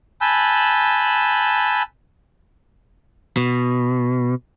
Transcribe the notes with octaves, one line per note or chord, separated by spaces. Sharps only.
G#5 A5 B5 E6 F#6 G6
B2